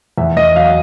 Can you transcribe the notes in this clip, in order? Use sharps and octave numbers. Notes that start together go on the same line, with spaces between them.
E2 E5
E2 D#5
F#3 F5